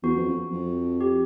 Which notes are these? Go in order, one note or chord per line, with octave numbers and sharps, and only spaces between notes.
E2 F#4
F2
F2
F2
G4